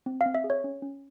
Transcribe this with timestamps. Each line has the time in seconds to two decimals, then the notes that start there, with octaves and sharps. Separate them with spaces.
0.06 C4
0.21 F5
0.26 C4
0.35 E5
0.44 G#4
0.50 C#5
0.64 C#4
0.82 C#4